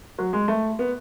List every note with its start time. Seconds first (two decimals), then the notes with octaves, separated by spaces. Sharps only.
0.19 F#3
0.33 G#3
0.48 A3
0.79 B3